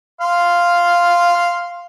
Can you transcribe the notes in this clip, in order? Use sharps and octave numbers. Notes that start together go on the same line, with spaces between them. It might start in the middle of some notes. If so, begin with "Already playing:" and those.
F5 C6